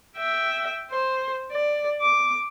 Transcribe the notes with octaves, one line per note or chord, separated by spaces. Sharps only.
E5 G5
C5
D5
D6